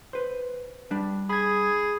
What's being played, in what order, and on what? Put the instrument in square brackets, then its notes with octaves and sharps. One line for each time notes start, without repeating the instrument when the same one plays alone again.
[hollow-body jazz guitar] B4 C5
G3 D4
[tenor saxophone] G#4 [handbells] B5 G#6